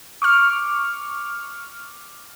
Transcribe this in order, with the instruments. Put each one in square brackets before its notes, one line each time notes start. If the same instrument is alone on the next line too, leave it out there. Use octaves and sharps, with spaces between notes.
[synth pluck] C#6 D6 F6